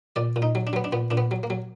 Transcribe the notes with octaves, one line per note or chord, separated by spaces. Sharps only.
A#2 D5
A#2
D#4
F#3
D4
F#3 B3
D4
A#2 B3
A#2 D4
B3
F#3
A#3
F#3